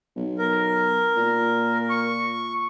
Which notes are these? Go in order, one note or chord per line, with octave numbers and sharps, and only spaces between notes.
B1
A#4
A#2
C#6